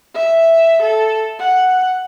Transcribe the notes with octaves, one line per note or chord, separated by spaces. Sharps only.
E5
A4
F#5